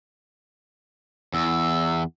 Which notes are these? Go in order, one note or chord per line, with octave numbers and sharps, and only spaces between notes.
E2 E6